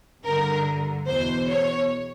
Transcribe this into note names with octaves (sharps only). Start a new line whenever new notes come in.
G2 D3 A#4
E2 B2 C5
C#5